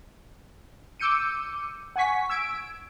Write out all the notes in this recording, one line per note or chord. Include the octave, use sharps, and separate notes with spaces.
D6 E6 G6 C#7 D#7
F#5 G#5 C#6 B6
E6 G#6 D7